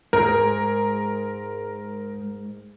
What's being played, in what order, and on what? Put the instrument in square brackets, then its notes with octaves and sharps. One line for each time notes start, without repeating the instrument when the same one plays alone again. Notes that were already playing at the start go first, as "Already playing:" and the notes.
[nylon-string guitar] G#2 [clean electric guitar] G#3 G#4 [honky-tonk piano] A#4